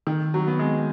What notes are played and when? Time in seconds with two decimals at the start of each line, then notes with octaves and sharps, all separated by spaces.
0.07 D#3
0.34 F#3
0.47 B3
0.59 G#3